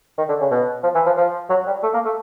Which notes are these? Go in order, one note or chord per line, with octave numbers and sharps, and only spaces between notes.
D#3
D3
C#3
B2
F3
E3
F3
F3
F#3
G3
A3
A#3
A3